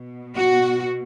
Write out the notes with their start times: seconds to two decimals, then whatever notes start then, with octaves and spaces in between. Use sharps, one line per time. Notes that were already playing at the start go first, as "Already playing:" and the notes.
Already playing: B2
0.35 F#4